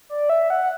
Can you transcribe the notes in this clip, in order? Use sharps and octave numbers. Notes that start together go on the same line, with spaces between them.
D5
E5
F#5